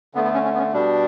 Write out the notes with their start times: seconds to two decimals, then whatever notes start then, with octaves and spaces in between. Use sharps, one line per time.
0.14 D3 A3 B3
0.24 B3
0.34 C#4
0.44 C#4
0.54 B3
0.58 C#4
0.73 B2 G3 D4